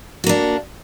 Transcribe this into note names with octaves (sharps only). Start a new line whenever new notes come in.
A#3 D4 F#4